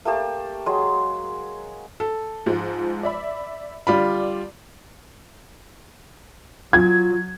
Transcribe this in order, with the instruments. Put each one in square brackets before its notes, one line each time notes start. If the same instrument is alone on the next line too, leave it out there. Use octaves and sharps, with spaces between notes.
[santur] A3 A#3 G4 A5
F#3 G#3 G#4 C6
[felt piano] A4
[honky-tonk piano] G#2 F3 G#3
D5 E5 B5
[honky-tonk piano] D3 D5 D6 [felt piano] G3 F4 B5
[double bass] F#3 [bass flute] F4 [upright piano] G#6